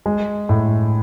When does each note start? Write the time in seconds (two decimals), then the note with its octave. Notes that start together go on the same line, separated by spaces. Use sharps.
0.06 G#3
0.49 A2